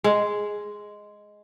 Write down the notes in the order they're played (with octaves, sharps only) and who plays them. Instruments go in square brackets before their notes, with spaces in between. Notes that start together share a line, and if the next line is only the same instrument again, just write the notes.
[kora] G#3